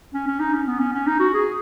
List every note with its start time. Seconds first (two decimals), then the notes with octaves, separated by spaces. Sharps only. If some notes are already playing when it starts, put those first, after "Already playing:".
0.14 C#4
0.27 C#4
0.40 D#4
0.54 C#4
0.67 B3
0.79 C#4
0.93 C#4
1.07 D#4
1.20 F#4
1.34 G#4